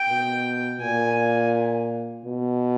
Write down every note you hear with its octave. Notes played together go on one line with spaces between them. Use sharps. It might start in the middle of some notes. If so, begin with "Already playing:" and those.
Already playing: G5
B2
A#2 G#5
B2